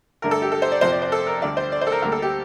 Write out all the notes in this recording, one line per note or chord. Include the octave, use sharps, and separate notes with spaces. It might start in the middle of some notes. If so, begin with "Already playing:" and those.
G2 D3 A3 A#4
A4
G4
A4
C5
D5
F2 C3 F3 C5
D5
C5
A4
A#4
D2 D3 G3 D5
C5
D5
C5
A4
A#4
D2 D3 G3 A#3 A#4
A4
G4